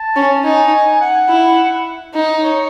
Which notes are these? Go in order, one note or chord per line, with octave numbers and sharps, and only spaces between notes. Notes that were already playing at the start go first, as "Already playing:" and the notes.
Already playing: A5
C#4
D#4 G#5
F#5
E4
D#4
C#5